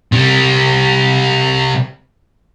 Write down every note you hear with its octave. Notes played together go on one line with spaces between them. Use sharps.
C3 G3